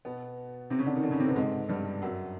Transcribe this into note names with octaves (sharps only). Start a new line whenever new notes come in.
B2 B3
C3 C4
C#3 C#4
D3 D4
D#3 D#4
D3 D4
C#3 C#4
C3 C4
B2 B3
G#2 G#3
G2 G3
F#2 F#3